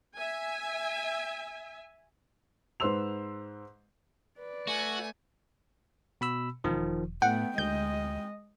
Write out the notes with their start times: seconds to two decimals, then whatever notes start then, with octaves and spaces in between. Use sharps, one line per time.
0.17 E5 G#5
2.80 G#2 B4 C5 C6 E6 F7
4.39 B4 D5
4.67 A3 F#4 G#5
6.21 B2 B5 E6
6.64 E1 D#3 F3
7.22 A2 A3 B3 F#5 G5
7.58 D2 G#3 D#5 G6